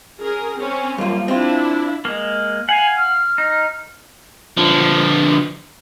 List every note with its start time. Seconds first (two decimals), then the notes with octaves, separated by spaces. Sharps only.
0.18 C#4 G#4 A#4
0.55 C4 C#4
0.98 F#2 F3 G3 A#3 F4
1.28 C4 D4 E4 F4
2.05 G#3 A#3
2.69 F5 F#5 G#5
2.97 F6
3.38 D#4
4.57 D3 F3